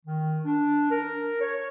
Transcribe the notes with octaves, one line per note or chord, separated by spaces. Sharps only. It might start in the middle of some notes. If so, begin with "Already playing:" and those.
D#3
D4
A#4
C#5